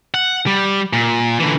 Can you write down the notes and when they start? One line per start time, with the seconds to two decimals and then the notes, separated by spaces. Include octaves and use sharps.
0.14 F#5
0.47 G3
0.93 A#2
1.40 D3 E3